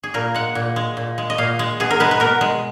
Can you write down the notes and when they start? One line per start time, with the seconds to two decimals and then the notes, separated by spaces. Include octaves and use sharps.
0.03 G#4
0.14 A#2 A#4
0.34 G#3 F#5
0.55 A#2
0.76 G#3
0.97 A#2
1.18 G#3
1.30 D#5
1.38 A#2 F5
1.59 G#3
1.80 B2 G#4
1.91 A#4
2.00 G#3 B4
2.11 B4
2.20 B2 A#4
2.41 G#3